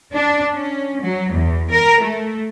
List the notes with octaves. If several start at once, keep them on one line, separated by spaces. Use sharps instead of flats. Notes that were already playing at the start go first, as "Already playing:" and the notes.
D4
C#4
F#3
E2
A#4
A3